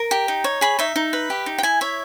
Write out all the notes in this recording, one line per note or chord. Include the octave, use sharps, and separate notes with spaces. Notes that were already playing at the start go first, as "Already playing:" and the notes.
Already playing: A#4
G4
D#4
C#5
G#4 B5
D#4 E5
D#4
B4
G4
D#4
G5
E4 G#5
C#5 E5